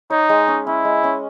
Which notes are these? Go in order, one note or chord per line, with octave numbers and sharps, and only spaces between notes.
D#4 C#5
G#3
C#4
C#4 E4
G#3
C#4